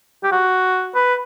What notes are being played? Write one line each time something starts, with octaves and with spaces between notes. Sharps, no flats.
G4
F#4
B4